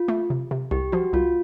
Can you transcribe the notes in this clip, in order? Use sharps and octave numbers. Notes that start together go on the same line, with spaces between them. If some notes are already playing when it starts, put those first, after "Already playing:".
Already playing: F4
A3
C3
C3
C2 G4
F3 F#4
C2 F4